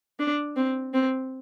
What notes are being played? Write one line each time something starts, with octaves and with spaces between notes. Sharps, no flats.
D4
C4
C4